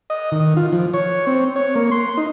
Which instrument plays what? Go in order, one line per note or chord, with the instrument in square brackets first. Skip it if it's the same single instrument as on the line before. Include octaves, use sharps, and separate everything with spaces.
[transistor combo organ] D#5
D#3
F4
F3
C#5
C4
C#5
A#3
C6
D#4